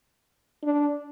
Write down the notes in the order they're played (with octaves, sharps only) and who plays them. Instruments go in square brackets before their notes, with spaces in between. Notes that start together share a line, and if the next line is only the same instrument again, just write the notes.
[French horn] D4